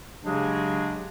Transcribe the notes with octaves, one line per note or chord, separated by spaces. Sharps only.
C#3 F#3 G#3 D4 G4 G#4